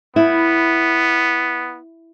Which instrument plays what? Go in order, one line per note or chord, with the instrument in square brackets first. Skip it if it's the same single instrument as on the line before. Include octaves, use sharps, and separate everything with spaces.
[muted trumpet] B3 [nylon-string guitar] E4